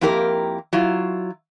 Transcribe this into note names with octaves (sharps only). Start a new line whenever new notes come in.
F2 A#3 E4 G4 A#4 G5
F#3 E4 F4